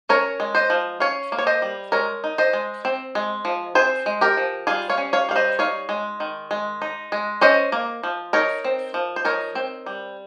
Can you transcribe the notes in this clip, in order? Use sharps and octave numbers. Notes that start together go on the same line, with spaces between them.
C#4 A#4 C#5
G#3
C5 D#5
F3
C#4 C#5 F5
A#3
C#5
C5 D#5
G3
G#3 A#4 C#5
D#4
C5 D#5
G#3
C4
G#3
F3
C4 G#4 C5
G#3
G4 A#4
F3
G3 F4 G#4
C#5 F5
C#4
C#5 F5
G3 F5
C5 D#5
D#4 C#5 F5
G#3
D#3
G#3
D#4
G#3
C#4 C5 D#5
A#3
F3
D#4 A#4 C#5
C4
F3
C5
D#4 A#4 C#5
C4
G3